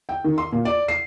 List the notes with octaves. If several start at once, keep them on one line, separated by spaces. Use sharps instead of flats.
G5
D#3
C6
A#2
D5
C7